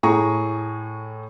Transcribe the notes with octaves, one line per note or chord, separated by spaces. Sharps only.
A2 G#4 A#5 C#6